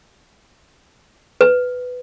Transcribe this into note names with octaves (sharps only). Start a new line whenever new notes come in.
B4